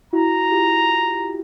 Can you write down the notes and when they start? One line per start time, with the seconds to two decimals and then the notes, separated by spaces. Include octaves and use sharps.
0.13 E4 F#4 A#5
0.51 F4 G4